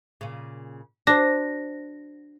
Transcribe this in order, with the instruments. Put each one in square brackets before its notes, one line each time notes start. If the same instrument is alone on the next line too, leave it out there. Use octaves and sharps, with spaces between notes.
[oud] A#2 C#3
[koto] D4 [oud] F#4 C5 [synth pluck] A#6